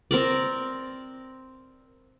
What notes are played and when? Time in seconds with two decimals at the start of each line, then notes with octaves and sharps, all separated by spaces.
0.11 C4 A#4 D5